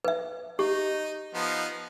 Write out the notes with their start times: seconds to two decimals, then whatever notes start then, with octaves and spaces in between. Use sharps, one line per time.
0.05 B4 E5
0.59 D#4 G4
1.34 F3 B3 D#4